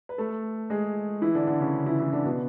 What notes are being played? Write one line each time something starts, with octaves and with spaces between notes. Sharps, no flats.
B4
A3 A4
G#3 G#4
E3 E4
D3 D4
D3 D4
C#3 C#4
E3 E4
E3 E4
D3 D4
B2 B3